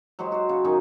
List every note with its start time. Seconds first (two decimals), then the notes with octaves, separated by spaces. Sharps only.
0.19 F#3 G#3 G4 C5
0.32 F#4 C5
0.49 C#3
0.64 F#2 D#3 D#4 G#4